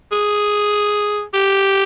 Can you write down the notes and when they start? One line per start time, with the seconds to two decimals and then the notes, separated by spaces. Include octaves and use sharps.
0.12 G#4
1.34 G4